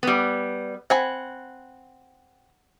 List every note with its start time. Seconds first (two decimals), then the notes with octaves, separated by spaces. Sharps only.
0.03 G3 B3
0.90 C4 F#5 G#5 B5